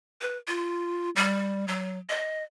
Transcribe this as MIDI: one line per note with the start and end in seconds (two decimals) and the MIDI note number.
0.21 0.37 71
0.47 1.09 65
1.16 1.67 55
1.68 1.98 54
2.09 2.43 75